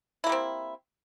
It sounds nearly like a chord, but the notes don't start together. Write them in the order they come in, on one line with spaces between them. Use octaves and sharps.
E4 A#3 G3 C4